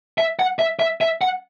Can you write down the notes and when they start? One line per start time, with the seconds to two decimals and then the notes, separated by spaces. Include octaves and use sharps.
0.18 E5
0.39 F#5
0.59 E5
0.79 E5
1.01 E5
1.21 F#5